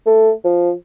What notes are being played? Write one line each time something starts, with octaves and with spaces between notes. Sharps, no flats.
A3
F3